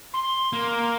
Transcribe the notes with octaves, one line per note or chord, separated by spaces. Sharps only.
C6
A#3